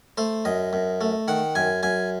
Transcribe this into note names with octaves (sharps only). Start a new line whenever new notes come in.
A3 C5
F#2 D#5
F#2
A3
D#3 F#5
F#2 G#5
F#2 G#5